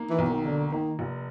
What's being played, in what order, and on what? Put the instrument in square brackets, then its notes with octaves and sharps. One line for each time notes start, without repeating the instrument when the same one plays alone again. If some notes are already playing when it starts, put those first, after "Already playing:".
Already playing: [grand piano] A#3 D#4
[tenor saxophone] E3
[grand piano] B1
[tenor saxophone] D#3
[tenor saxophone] D3 [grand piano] A#3
[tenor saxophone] D#3 [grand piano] A#3
[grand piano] F1